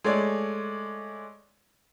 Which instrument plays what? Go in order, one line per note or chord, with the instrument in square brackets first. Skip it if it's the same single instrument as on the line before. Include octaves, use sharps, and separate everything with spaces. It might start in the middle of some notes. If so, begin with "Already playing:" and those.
[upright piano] G#3 A3 C#5 D5 D6